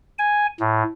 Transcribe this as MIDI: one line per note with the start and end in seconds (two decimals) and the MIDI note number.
0.19 0.47 80
0.60 0.83 45